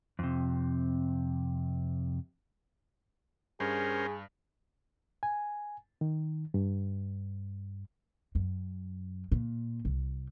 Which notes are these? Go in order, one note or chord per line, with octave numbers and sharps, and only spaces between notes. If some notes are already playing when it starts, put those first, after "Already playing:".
F2 C3
G2 C#4 G#4 A#4 C5
G#5
D#3
G2
F#2
A#2
C2